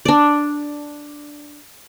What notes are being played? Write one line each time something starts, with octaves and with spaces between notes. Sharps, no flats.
D4 D5